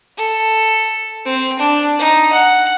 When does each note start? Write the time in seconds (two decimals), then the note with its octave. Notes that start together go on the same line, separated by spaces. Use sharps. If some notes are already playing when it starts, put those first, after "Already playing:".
0.17 A4
1.25 C4
1.59 D4
1.99 D#4
2.33 F#5